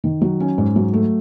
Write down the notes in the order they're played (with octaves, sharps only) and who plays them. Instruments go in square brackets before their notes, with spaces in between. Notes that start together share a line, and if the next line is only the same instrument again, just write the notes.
[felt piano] D#3
F#3
C#4
G#2
F#3
A3